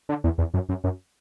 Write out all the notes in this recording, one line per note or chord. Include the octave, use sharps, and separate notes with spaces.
D3
E2
E2
F#2
F#2
F#2